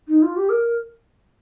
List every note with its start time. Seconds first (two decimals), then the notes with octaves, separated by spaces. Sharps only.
0.08 D#4
0.23 F4
0.36 G4
0.49 A#4